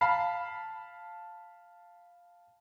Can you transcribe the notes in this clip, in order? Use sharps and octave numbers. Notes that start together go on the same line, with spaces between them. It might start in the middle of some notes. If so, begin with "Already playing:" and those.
F5 A5 B5 F6 C7